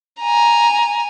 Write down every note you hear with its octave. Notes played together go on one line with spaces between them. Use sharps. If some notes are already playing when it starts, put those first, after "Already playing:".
G#5 A#5